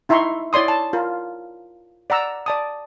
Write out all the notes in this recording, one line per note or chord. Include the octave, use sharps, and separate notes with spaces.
D#4 E4 E5 A#5 C6 C#6
E4 C#5 D5 C6 D#6
A5
F4 A#4
D5 F#5 A#5 E6
D5 A5 D#6